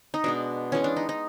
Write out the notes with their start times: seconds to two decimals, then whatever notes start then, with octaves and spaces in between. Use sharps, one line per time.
0.14 D#4
0.24 B2 G#3 B3 D4
0.72 E3 G#3 B3 C#4
0.84 D4
0.96 D#4
1.09 D#4